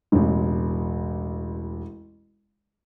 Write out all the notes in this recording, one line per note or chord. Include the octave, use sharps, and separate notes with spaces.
E1 A1